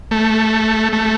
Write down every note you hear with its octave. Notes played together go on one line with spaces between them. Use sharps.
A3
A3